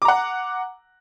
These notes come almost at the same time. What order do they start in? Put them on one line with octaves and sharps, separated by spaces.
D6 A#5 F#5